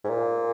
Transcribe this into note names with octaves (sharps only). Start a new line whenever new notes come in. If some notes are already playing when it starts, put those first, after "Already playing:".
G#2
A#2